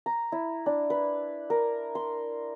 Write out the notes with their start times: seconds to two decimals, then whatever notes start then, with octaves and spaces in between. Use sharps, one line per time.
0.06 A#5
0.32 E4
0.66 D4
0.90 B4
1.50 A#4
1.95 C6